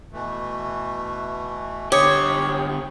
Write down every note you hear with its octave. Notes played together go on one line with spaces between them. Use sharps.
B2 E3 A3
D3 G4 C#5 D6 D#6 C#7